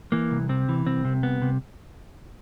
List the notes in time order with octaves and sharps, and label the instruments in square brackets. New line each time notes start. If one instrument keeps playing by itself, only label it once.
[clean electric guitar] E3 A#3
C2
C3 C4
E3
C2 C4
C3
C2 B3
C3